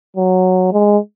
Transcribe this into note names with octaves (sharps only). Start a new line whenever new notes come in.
F#3
G#3